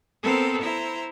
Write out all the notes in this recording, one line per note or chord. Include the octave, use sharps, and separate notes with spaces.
B3 C4 A4 A#4 C5
E4 C5 A#5